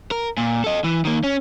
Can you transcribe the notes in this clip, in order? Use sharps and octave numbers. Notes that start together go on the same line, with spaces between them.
A#4
A#2
A4 D#5
E3
D#3 A#3
C#4